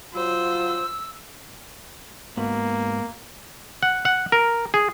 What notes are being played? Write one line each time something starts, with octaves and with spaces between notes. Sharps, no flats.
F#3 F4 C5 E6
G#2 A#3 B3 F#4
F#5
F#5
A#4
G#4